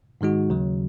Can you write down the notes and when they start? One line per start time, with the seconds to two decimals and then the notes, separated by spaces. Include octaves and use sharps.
0.21 G#2 D#3 G#3 D#4 F#4
0.50 D#2 C#3 F#3